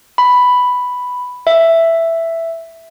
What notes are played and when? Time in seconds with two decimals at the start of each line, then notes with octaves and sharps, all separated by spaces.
0.18 B5
1.47 E5